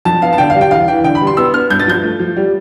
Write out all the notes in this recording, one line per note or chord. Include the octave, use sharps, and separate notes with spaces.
F2 A5
B3 F5
A5
D3 G5
G3 F5
G5
E2 F5
E3 G5
D3 G5
B5
G3
C6
B3 E6
B3 F6
G2 G6
A6
F3 G6
A3
F3
G3